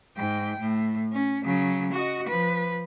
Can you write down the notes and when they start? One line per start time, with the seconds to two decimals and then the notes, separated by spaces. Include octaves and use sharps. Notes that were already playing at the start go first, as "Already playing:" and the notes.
0.17 G#2 G5
0.60 A2
1.13 C#4
1.45 C#3 F#3
1.93 F#4 D#5
2.27 F3 B4